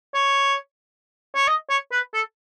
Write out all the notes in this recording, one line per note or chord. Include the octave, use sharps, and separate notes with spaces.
C#5
C#5
D#5
C#5
B4
A4